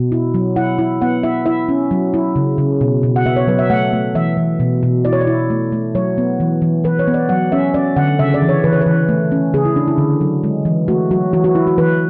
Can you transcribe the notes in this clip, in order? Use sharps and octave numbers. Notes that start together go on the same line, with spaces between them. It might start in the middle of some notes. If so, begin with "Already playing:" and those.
Already playing: B2
E4
F#3
E4 F#5
E4
B3 F#5
E4 E5
E4 E5
C#4
F#3
E4
C#3
C#3
B2
B2
F#5
B3 E5
C#5
F#3 B4
E5
A3 F#5
A3
E3 E5
E3
B2
B2
E4 D5
C#5
D5
E4
A3
A3
F#3 C#5
B3
E3
E3
E3 B4
C#5
B3
D5
F#3 F#5
C#4 E5
C#4 D5
D3 F#5
C#3 E5
D5
E3
C#5
E3 B4
C#5
B4
E3
A3
C#4
C#3 G#4
E4
D4
E4
D3
F#3
G#3
E3
A3 F#4
F#3 F#4
E3 F#4
F#4
E4
F#4
E3 B4